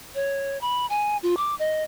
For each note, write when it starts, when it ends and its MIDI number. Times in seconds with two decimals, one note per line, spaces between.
0.15 0.60 73
0.61 0.86 83
0.90 1.17 80
1.23 1.35 65
1.37 1.55 86
1.59 1.84 75